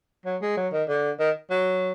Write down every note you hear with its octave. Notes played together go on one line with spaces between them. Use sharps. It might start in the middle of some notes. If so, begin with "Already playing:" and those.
F#3
G#3
F#3
D#3
D3
D#3
F#3